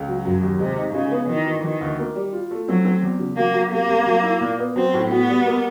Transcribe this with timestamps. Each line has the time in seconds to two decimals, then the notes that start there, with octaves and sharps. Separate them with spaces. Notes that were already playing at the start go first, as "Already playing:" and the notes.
Already playing: C#2
0.08 F#3
0.25 F#2 F#3
0.42 D#2
0.59 C3 G#3
0.78 D#4
0.94 C#3 G#3
1.11 B3
1.29 D#3 E3
1.46 E3
1.64 D#3 E3
1.81 D2
1.99 A#3
2.15 G3
2.33 F4
2.51 A3
2.68 F#3 C4
2.85 C4
3.02 E2
3.19 C#3
3.37 F#3 A#3
3.54 F#3
3.71 C3 A#3
3.89 C2
4.06 F#3
4.24 E4
4.41 A#2
4.59 B3
4.76 F#3 C4
4.94 A2
5.10 B3 F#4
5.28 G3
5.46 A#3